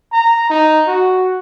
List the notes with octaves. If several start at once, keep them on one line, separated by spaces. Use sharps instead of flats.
A#5
D#4
F#4